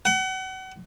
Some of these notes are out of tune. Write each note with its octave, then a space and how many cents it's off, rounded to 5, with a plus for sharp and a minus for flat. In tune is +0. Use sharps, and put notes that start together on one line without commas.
F#5 +35